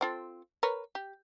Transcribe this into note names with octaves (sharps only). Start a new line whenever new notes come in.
C4 F4 A4
A#4 B4 C#5
G4